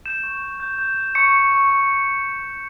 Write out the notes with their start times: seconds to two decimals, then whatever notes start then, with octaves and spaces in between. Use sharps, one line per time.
0.06 G6 E7
0.23 C#6
0.42 G6
0.60 G6
0.78 G6
0.97 G6
1.15 C#6 C#7
1.34 C#6
1.52 C#6
1.70 C#6